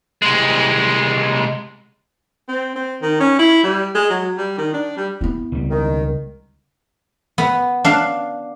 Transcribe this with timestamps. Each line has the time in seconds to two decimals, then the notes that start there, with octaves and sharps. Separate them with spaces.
0.22 C2 G#3
2.48 C4
2.76 C4
3.02 D#3
3.20 C#4
3.39 E4
3.64 G3
3.95 G#3
4.10 F#3
4.38 G3
4.58 D#3
4.73 D4
4.97 G3
5.21 B3 E4
5.52 C#2 G3
5.70 D#3
7.38 B3
7.85 D4 F5